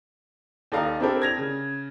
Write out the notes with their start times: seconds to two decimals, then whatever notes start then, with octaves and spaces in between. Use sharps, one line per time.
0.72 D#2 A4 D5 D#5 F5 A#5
1.00 C4 D4 E4 G4 A4 A#4
1.22 G#6 A#6 F7
1.37 C#3